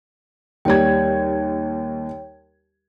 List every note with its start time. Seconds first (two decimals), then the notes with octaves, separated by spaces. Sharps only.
0.65 D#2 G3 C#5 G5 G#6